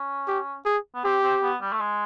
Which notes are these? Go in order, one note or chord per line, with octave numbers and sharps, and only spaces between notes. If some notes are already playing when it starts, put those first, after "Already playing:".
Already playing: C#4
G4
G#4
B3
C4 G4
C4
B3
G3
A3
G#3